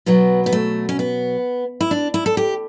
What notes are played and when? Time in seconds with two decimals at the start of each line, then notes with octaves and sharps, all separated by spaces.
0.06 B2 F#3 B3
0.46 B3
0.53 A3
0.89 C#4
0.99 B3
1.81 E4
1.91 D4
2.14 E4
2.26 A4
2.37 G4